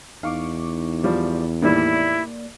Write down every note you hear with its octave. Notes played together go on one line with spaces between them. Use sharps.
E2 D#4 F5 C#6 D6
F3 G3
A2 D#3 G3 A#3 E4 D5